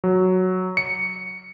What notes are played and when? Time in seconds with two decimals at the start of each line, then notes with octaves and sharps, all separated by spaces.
0.04 F#3
0.77 C#7